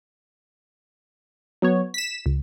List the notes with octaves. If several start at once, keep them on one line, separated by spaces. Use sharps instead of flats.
F#3 B3 C#5
B6 E7
C#2